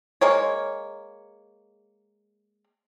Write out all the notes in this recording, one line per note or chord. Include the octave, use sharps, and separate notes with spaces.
G#3 A#3 C#5